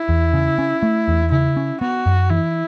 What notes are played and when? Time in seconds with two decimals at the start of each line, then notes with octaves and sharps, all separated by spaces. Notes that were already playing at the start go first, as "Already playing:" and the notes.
Already playing: E4
0.09 E2
0.33 C#3
0.58 C#4
0.83 A3
1.08 E2
1.31 C#3 E4
1.57 C#4
1.81 B3 F#4
2.06 F#2
2.30 E3 E4